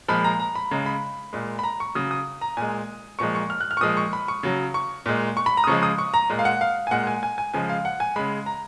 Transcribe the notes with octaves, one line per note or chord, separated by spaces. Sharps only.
A#2 F3 G#3 B5
A#5
A#5
B5
C#3 G#3 A#5
B5
A#2 G#3
B5
A#5
C#6
C#3 F#3 D#6
D#6
A#5
A#2 G#3 G#5
A#2 F3 G#3 C#6
C#6
F6
F#6
F6
C#6
A#2 F3 G#3 D#6
C#6
B5
C#6
C#3 F#3
C#6
A#2 G#3
C#6
B5
A#5
D#6
C#3 F3 G#3 C#6
D#6
C#6
A#5
A#2 G#3
F5
F#5
F5
G#5
A#2 G#3 F#5
G#5
G#5
G#5
C#3 F3 G#3 G#5
F5
F#5
G#5
C#3 G#3 B5
A#5